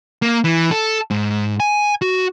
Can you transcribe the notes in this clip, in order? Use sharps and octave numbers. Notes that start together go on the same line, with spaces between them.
A#3
E3
A4
G#2
G#5
F#4